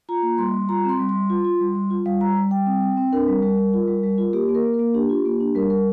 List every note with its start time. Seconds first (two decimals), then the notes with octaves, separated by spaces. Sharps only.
0.09 F4 A#5
0.23 A#3
0.38 G3 C6
0.54 G3
0.69 F4 A#5
0.85 C4 C6
0.99 G3
1.09 C6
1.15 G3
1.30 F4
1.45 F4
1.61 G3
1.75 G3
1.90 F4
2.06 G3 F5
2.21 G3 A#5
2.37 G3
2.51 G3 G5
2.66 C4
2.81 C4
2.97 C4
3.13 D4 A#4
3.28 G3
3.42 G3
3.58 G3
3.74 F4
3.88 G3
4.03 G3
4.18 F4
4.33 A#3 G4
4.49 A#3
4.55 A#4
4.65 A#3
4.74 A#4
4.79 A#3
4.94 D4 G4
5.09 F4
5.25 A#3
5.40 D4
5.55 G3 A#4
5.70 G3 A#4